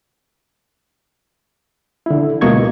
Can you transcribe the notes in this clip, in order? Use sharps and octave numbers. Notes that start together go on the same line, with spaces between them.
D3 E4
C#2 B2 A#3 D#5 C#6 G#6